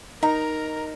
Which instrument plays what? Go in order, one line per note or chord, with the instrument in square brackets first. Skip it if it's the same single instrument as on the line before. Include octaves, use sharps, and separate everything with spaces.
[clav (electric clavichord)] D#4 [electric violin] A#4 [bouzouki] A#5